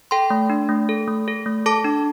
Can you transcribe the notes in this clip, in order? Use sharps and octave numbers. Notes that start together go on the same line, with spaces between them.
A4 G5 C6
A3
D4
A3
A4
A3
A4
A3
A4 A5 D6
D4